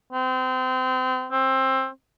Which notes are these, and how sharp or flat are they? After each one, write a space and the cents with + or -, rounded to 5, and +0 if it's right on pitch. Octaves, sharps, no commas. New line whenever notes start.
C4 -30
C4 +20